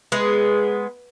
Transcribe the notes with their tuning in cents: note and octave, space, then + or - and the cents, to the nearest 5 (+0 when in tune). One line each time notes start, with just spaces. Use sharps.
G#3 +0 B3 +0